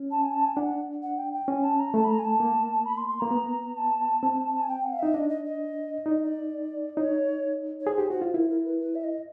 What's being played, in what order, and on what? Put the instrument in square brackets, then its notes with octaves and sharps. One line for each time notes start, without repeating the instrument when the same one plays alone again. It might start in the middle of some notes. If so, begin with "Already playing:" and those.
Already playing: [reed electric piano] C#4
[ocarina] A5
G#5
A5
G#5
[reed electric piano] D4 [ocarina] F#5
[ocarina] F#5
G5
G5
[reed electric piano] C#4 [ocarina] G#5
[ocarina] A5
A#5
[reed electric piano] A3 [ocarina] A5
[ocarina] B5
A#5
G#5
A5
[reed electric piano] A#3
[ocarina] B5
C6
C6
[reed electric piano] A#3 [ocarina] A#5
[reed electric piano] B3
[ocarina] A5
[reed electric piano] C4
[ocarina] A5
G#5
G5
F#5
F5
[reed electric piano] D#4 [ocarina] E5
[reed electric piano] D4 [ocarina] D#5
[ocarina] D#5
D#5
[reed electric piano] D#4 [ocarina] D5
[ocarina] D#5
D5
[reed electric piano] D#4 [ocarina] C#5
[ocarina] C#5
[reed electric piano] G#4 [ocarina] C5
[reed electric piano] G4
[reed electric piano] F#4 [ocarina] C5
[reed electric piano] F4
[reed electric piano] E4 [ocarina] A#4
[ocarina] A#4
B4
B4
E5
D#5